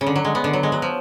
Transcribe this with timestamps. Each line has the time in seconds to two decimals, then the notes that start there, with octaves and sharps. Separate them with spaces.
0.01 C#3
0.07 D3
0.16 F#3
0.25 G#3
0.35 B3
0.44 D3
0.53 F#3
0.63 G#3
0.72 F#3
0.82 F3